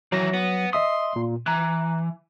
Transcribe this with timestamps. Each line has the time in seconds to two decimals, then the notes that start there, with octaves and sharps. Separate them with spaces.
0.12 D#3 E3 F#3 A#6
0.33 B3
0.73 D#5 E5 C6 D#6
1.16 A#2
1.46 E3 A#5 F#6